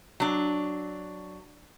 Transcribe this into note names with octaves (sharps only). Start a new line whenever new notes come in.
F#3 D4